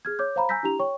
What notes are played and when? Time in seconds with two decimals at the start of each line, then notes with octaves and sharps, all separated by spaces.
0.05 G#4 F6 G#6
0.19 C#5 D6 G6
0.36 C5 F5 A#5 B5
0.49 G#5 A#5 E6 G6 A#6 B6
0.63 D4 E4 G4 A#5 F7
0.79 C#5 G5 C#6